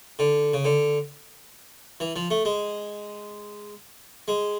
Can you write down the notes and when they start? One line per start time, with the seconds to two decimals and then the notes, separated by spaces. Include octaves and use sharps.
0.19 D3
0.54 C#3
0.65 D3
2.00 E3
2.16 F3
2.30 A3
2.45 G#3
4.28 G#3